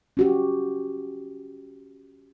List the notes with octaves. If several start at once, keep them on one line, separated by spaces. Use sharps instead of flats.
C#4 F#4 G4